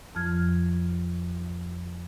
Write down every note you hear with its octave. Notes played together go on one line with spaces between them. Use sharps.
F2 F3 F6 G#6